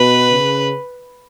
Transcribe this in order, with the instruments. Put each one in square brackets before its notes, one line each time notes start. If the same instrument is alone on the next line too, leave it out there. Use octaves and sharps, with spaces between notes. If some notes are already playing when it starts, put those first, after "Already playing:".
Already playing: [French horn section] B2 [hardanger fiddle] B4
[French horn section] C#3